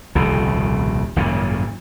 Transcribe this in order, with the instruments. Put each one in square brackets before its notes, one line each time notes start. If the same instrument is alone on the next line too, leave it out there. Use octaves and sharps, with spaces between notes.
[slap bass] D#1 C2 C#3 F3
G#1 F#2 A#2 C#3